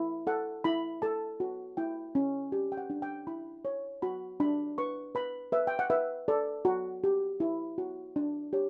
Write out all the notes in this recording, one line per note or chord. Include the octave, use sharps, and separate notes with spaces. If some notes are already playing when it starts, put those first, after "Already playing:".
Already playing: E4
A4 F#5
E4 B5
A4 A5
F#4
E4 G5
C#4
G4
G5
F#5
D4
G5
E4 B5
C#5
F#4 B5
D4 B5
B4 C#6
B4 B5
B4 E5
G5
F#5
B4 E5
A4 D5
F#4
G4
E4
F#4
D4
G4 C#5